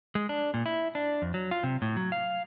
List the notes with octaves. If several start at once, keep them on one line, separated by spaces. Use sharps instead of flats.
G#3
D4
A#2
E4
D4
F2
F#3
F4
C3
A2
F#3
F5